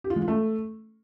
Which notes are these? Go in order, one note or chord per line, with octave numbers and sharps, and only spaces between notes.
G4
F4
G#3
F4
A3